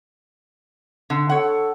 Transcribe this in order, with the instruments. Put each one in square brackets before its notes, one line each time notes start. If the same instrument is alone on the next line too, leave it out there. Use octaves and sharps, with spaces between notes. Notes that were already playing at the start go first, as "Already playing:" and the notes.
[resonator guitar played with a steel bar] D3
[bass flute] A4 [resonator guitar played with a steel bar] C#5 F#5